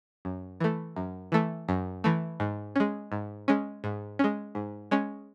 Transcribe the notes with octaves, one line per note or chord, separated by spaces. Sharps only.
F#2
E3 A3
F#2
E3 A3
F#2
E3 A3
G#2
G#3 C#4
G#2
G#3 C#4
G#2
G#3 C#4
G#2
G#3 C#4